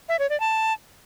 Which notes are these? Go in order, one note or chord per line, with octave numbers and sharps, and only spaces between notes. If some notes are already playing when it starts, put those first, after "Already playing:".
E5
C#5
D5
A5